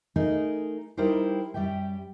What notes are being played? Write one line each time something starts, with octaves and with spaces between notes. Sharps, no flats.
A3 D#4 G#4 A#4
G3 D#4 E4 G4 A#4 C5
F#2 G3 G4 E5 G5